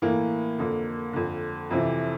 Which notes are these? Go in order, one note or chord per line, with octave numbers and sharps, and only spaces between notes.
A2 E3 A#3
F2 D3
F2 D3
F2 C3 E3